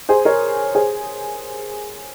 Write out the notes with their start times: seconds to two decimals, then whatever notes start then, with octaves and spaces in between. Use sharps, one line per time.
0.09 G#4 C5
0.25 A#4 C#5
0.75 G#4 C5